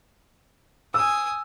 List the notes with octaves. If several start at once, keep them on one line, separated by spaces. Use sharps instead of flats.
G#5 D#6 E6